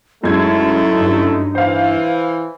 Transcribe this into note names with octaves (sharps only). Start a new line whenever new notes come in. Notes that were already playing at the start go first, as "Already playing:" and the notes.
F#2 G#3 A3 D#4 E4 G#6
G2
E3 C5 F5